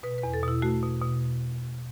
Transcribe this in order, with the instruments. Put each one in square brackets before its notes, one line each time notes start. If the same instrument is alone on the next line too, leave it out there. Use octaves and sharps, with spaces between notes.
[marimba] B2 B4
B4
E2
A4
B2 E4
A3 F#4
B2
B2